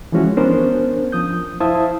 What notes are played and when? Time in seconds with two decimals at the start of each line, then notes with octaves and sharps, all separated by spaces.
0.12 E3 F3 G#3 C#4 F#4
0.37 B3 C#4 D4 A#4 C5
1.12 F3 D#6 G6
1.60 E4 C5 E5 F5 A5 D#6